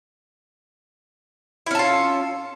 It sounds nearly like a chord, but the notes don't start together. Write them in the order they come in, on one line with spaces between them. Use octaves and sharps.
E4 C#4 A4 F4